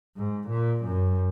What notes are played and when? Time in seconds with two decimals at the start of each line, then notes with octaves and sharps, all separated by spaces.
0.17 G#2
0.48 A#2
0.85 F#2